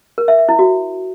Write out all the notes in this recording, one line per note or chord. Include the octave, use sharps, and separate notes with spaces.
A#4
E5
E5
E4
F#4